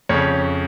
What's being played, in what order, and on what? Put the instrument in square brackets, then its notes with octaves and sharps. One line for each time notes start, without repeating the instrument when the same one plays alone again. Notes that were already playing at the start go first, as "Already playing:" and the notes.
[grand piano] F2 C#3 C#5